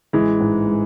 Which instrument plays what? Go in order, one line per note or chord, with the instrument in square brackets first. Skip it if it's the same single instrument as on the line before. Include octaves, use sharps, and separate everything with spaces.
[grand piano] A1 [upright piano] E3 G#3
[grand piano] G#2
G#3